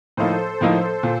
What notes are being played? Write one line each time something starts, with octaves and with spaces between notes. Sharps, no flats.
A2 F3 A#3 D#4 A4 C5
A2 F3 A#3 D#4
A#2